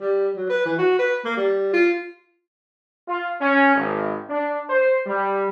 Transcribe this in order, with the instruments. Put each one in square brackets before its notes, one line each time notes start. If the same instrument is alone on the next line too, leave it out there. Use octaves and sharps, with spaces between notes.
[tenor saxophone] G3
F#3
B4
E3
F#4
B4
A#3
G3
F4
[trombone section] F4
C#4
G#1
D4
C5
G3